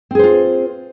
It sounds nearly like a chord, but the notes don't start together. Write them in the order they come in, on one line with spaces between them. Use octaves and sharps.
C4 G#4 C5 F4